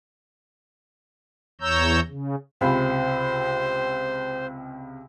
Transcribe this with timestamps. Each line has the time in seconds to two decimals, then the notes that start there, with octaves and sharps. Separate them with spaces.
1.61 E2 C#5 A#5 E6 G6
2.09 C#3
2.61 C#2 C3 C5 B5